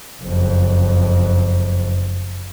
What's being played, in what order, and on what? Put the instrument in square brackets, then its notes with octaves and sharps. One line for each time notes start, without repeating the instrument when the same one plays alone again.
[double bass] F#1 F2